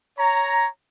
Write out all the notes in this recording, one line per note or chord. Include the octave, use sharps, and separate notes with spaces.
C#5 A#5